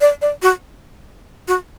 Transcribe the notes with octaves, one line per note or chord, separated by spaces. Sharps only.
D5
D5
F#4
F#4